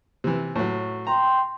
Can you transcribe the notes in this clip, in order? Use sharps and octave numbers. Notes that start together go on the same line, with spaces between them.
C3 E3
A2 F#3
G5 A#5 C6